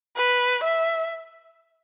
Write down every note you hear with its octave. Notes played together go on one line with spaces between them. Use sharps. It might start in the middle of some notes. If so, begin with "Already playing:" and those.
B4
E5